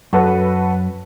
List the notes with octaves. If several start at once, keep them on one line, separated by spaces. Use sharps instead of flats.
F#2 F#4 A4 B4